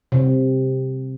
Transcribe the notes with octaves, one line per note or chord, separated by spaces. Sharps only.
C3